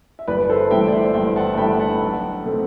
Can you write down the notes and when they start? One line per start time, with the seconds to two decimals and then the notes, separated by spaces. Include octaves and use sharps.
0.19 E5
0.28 G1 B4 D5
0.49 A4 C5
0.70 G2 E3 A3 D4 E5 G5
0.88 D5
0.92 C5 E5
1.14 G1 E5 G5
1.36 F#5 A5
1.54 A5
1.57 G2 E3 A3 D4 G5 B5
1.79 F#5 A5
2.01 B1
2.44 B2 A3 C4